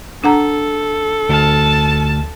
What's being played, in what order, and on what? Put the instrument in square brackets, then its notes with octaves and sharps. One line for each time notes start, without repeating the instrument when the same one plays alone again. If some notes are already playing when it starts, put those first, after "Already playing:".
[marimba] D4 F#5 A#5 [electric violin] A4
[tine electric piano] D2 F6 [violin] A5